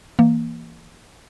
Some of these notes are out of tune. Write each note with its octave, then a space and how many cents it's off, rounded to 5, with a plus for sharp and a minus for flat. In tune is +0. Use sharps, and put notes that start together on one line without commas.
E3 +0 A#3 +0